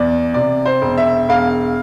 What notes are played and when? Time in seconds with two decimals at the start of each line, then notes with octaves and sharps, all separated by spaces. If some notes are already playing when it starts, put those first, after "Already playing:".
Already playing: E2 D5
0.34 C3 D5
0.65 C5
0.81 E1
0.97 E5
1.29 E1 F5